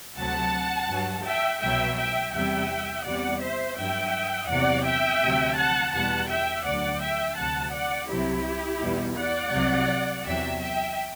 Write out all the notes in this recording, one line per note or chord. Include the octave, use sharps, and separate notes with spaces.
D2 C3 F#3 F#5 A5
G2 F#3
E5 G5
C2 B2 F#3 E5 G5
E5 G5
E2 C3 G3 E5 G5
E2 C3 G3 D5 F#5
C5 E5
G2 F#3 E5 G5
E2 C3 F#3 D5 F#5
E5 G5
D2 C3 F#3
F#5 A5
E2 B2 G3 F#5 A5
E5 G5
D2 D3 F#3 D5 F#5
E5 G5
D2 C3 F#3 F#5 A5
D5 F#5
C2 C3 F#3 E4 G4
E2 B2 G3
D5 F#5
C2 C3 F#3
E2 C3 F#3 E5 G5
E5 G5